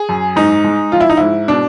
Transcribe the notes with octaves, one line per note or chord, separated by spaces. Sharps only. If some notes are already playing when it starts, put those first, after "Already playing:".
Already playing: G#4
F#2
G#2 D#4
G#3
F3 F4
E4
D#4
G#2 E4
B2 D4